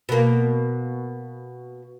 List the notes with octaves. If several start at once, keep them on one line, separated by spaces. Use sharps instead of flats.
B2 A#3